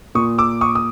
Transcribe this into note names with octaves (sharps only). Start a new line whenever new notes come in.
A#2 C#6 D#6
D6 E6
C#6 D#6
D#6